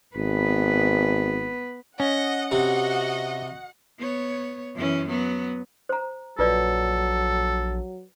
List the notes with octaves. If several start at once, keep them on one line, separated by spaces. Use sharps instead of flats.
G#1 B3 B4
C#4 D#5 F#5
C3 F#4 D#5
B3 C#5
F#2 E3 C#4
F#3 B3
C5 A#5
A#1 F#3 F4 A4 B4 D5